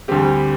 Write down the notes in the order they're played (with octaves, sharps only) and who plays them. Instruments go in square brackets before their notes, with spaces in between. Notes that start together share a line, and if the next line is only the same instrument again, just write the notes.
[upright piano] D2 D3 G3 C4 G4